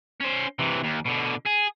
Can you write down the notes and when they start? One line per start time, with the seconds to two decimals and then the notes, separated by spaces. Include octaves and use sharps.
0.20 C#4 C5
0.59 C3 E3
0.83 D#2
1.05 B2 D3
1.45 G#4